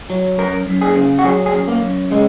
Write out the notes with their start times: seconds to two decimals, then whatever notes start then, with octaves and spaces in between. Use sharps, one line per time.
0.10 F#3
0.38 F#2 A#4
0.67 F#2
0.81 G#4
0.96 C#3
1.19 F#4
1.24 F#3 G#4
1.46 G#4
1.54 F#2
1.68 A#3
1.82 F#2
2.11 C#3 G#3